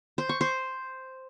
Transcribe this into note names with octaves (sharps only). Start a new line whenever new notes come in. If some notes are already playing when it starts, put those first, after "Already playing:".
C5
C#6
C5